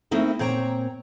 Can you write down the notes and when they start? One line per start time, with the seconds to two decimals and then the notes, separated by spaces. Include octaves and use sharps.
0.11 A3 A#3 C4 D#4 E4
0.39 A#2 C4 C#5 G5 A#5